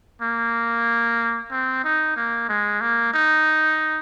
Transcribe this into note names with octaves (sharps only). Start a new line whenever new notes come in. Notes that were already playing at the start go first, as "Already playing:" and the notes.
A#3
C4
D#4
A#3
G#3
A#3
D#4